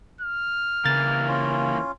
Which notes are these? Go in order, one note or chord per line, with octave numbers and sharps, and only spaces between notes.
F6
C#3 E3 A#3 A6
C#4 F4